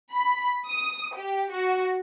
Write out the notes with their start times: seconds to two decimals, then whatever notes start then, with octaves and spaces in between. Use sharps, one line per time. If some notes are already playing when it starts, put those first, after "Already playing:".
0.13 B5
0.68 D#6
1.15 G4
1.51 F#4